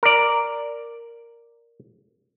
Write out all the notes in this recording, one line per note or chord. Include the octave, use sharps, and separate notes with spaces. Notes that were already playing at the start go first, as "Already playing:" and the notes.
A#4 D5